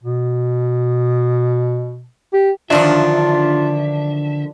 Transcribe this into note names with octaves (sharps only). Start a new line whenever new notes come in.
B2
G4
D3 D#3 F3 F#3 D4 F4 E5